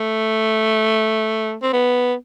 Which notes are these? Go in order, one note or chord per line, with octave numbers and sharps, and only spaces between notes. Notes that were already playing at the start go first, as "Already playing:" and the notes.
Already playing: A3
C4
B3